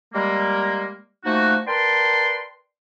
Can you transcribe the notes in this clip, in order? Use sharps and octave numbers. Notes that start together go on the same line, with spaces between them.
G3 G#3 A#3
F3 A3 A#3 D#4 F#4
A#4 B4 D5 G5 A5 C6